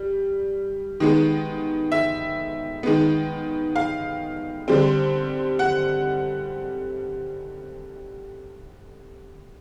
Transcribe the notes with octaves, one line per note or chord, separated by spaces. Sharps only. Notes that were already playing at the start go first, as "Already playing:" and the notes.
Already playing: G3
D#3 G#3 B3
E5
D#3 G#3 B3
F5
D3 G3 C4
F#5